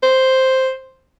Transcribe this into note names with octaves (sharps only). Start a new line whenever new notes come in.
C5